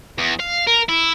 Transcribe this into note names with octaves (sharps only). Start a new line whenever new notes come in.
E2
F5
A#4
E4